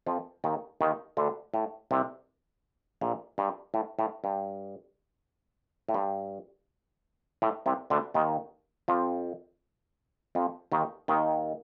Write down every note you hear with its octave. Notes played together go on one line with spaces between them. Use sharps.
F2 F3
D#2 D#3
D#2 D#3
D2 D3
A2
C2 C3
A#1 A#2
G2
A2
A2
G2
A2
G2
A2
C2 C3
D2 D3
D#2 D#3
F2 F3
F2 F3
D#2 D#3
D#2 D#3